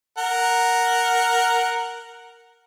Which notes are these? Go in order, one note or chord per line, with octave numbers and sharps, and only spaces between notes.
A#4 F#5